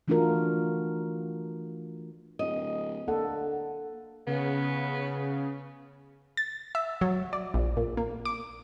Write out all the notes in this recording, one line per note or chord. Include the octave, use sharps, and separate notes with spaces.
E3 A3 D4 F4 F#4 A#4
D1 D#5
D3 A#3 A4 F#5
C#3 B3
A6
E5
F#3
D5
A#1
A#2
A#3
D6